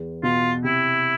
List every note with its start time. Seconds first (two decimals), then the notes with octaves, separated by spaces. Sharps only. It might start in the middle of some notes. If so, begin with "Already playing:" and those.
Already playing: E2
0.23 B2 F4
0.64 C3 E4